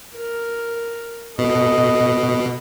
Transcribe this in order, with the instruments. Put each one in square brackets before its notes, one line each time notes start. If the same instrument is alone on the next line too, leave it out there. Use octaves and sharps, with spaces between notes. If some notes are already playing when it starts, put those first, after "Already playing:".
[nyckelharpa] A#4
[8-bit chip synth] B2 [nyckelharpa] A4 D#5